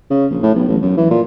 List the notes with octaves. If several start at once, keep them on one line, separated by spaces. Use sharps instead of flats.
C#3
A#1
A2
B1
A1
F#2
E3
A#2